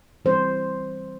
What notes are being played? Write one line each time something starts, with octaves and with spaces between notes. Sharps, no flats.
E3 G3 C4 C5